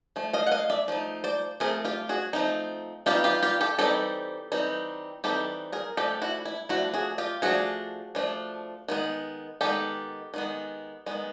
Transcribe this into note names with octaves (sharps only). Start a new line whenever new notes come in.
F3 A3
D#5 F5
F#5
D#5 F5
D5 E5
F3 A3 D#4
C5 D5
F3 A3 C4 G#4 A#4
F4 G4
F#4 G#4
F3 A3 C4 D#4
E3 G3 C4 D#4 F4 G4
F4 G4
F4 G4
G4 A4
E3 G3 C4 D#4 G4 A4
E3 G3 C4 D#4
E3 G3 C4 D#4 G4 A4
G#4 A#4
F3 A3 D4 G4 A4
E4 F#4
E4
F3 A3 D4 E4 F#4
F#4 G#4
F4 G4
F3 A3 D4 F#4 G#4
F3 A3 D4
D#3 G#3 B3
D#3 G#3 B3 G4 A4
D#3 G#3 B3
D#3 G#3 B3